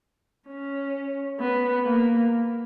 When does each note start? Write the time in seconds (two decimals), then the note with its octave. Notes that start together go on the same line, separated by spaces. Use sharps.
0.48 C#4
1.40 B3
1.85 A#3